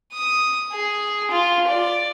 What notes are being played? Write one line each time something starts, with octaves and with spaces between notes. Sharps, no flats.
D#6
G#4
F4
D5